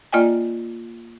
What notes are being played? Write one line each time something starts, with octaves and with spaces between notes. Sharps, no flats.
A#3 F4 D5 D#5 G5 G#5